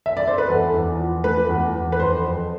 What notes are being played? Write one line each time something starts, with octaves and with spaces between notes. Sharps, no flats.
E5
D5
C5
B4
E2 A4
E2
F3
A3 B4
E2
E2
B4
F2 C5
F2